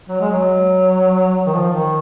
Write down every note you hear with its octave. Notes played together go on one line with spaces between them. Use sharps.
F#3
G#3
F#3
D#3
F3
D#3